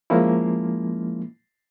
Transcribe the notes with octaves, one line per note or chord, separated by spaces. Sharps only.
F3 G#3 A#3 C#4 E4